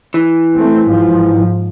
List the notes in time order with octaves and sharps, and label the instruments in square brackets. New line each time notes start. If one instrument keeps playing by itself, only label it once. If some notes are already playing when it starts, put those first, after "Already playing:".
[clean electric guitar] E3
[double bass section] A3 C4
G#2 F3